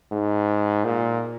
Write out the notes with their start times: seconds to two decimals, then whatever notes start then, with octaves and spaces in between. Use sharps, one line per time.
0.12 G#2
0.84 A#2